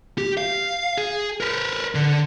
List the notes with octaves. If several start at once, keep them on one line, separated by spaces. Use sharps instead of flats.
G4
F5
G#4
A#4 B4
D3